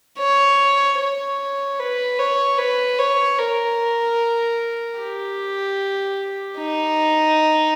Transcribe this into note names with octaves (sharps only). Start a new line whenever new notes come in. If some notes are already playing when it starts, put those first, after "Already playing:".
C#5
C#5
B4
C#5
B4
C#5
A#4
G4
D#4